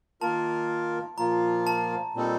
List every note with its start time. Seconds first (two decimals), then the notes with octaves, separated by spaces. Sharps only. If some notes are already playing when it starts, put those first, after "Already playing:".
0.21 D#3 A#3 F4 A#4 A5
1.18 A#2 F3 A#3 F4 A#5
1.67 A5
2.14 A#2 G3 C4 D#4 A4